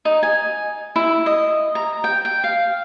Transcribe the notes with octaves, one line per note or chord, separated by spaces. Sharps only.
D#4
G#5
E4
D#5
A#5
G5
G5
F5